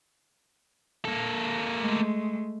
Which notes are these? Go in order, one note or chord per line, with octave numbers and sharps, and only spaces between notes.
A#3 A4
G#3 A3